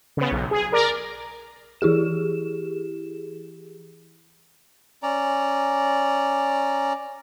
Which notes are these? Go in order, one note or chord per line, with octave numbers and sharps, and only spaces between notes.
C#3 B3
B1
G#4
A#4 D5 A#5
E3 E4 G4 G#4 E7
C#4 D5 A#5